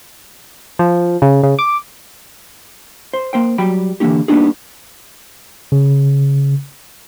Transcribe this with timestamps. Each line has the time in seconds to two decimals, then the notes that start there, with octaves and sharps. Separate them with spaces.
0.79 F3
1.22 C#3
1.43 C#3
1.59 D6
3.13 C5
3.33 A#3 C5 G5
3.58 F#3 G3 G5 B5
4.00 D3 E3 G3 A#3 D#4 G4
4.28 G3 A#3 B3 D4 D#4 G#4
5.72 C#3